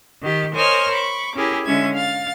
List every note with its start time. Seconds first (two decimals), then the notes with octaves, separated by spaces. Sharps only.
0.22 D#3 G4
0.55 A#4 C5 C#5 D#5 G#5 F6
0.92 B5 C#6 D6
1.35 C#4 E4 G4 G#4 A#4
1.65 D3 G#3 C#4 E5 G#6
1.95 F5 A6